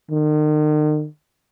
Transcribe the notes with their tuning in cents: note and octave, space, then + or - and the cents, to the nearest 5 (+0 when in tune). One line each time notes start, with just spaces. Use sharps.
D#3 -40